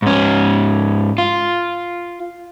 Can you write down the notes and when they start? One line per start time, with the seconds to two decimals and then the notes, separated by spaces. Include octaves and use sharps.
0.02 G#2 C#4
1.18 F4